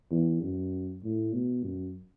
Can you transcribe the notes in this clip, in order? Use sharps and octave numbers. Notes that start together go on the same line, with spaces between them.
E2
F#2
A2
B2
F#2